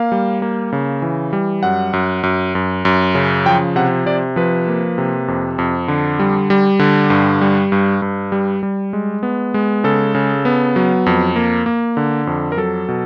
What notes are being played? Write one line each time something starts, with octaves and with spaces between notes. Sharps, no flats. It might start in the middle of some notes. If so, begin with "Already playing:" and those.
Already playing: A#3 F5
G3
A#3
C#3
E3
G3
F#2 F#5
F#2
F#2
F#2
F#2
C#3
F3 G5
C3 F#5
C3 D5
F3 B4
A#3
C3
F2
F2
D3
G3
G3
D3
G2
G3
G2
G2
G3
G3
G#3
B3
G#3
C#3 A4
C#3
B3
F#3
F2
A#3
A#3
D3
F2
A#4
F#3 A4
B2